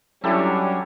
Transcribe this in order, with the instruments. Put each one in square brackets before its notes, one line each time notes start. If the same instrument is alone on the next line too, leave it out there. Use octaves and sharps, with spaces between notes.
[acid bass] F#3 [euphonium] G3 [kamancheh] C#4 D4 [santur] E4 G4 A4